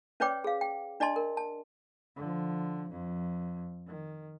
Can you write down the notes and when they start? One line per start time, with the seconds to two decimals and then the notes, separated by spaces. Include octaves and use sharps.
0.20 C#4 B4 C#5 D5 G5 D6
0.44 G#4 F5
0.61 G5
1.00 D4 D5 D#5 A5 C6
1.16 A#4
1.37 A5
2.16 D3 F3
2.90 F2
3.87 D#3